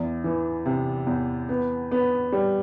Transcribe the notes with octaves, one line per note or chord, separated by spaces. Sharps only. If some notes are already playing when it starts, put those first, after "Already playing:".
Already playing: E2
E3
C3
E2
B3
B3
G3